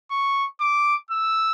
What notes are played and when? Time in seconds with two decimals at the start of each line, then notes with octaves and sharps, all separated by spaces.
0.11 C#6
0.61 D6
1.10 E6